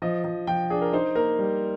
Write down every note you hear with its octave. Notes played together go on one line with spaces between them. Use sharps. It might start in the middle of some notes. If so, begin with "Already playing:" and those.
F3 D#5
F3
F3 G5
D4 G#4
A#4
D#4 C5
A#3 A#4
G3